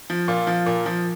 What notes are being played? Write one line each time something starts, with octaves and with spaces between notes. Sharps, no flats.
F3
A#2 F4
F3
A#2
F3